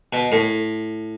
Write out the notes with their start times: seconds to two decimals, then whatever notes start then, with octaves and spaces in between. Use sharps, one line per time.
0.13 B2
0.32 A2